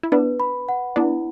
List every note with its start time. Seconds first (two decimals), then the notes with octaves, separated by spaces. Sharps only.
0.03 E4
0.12 B3 D4 B4
0.40 B5
0.69 F#5
0.96 B3 D4 E4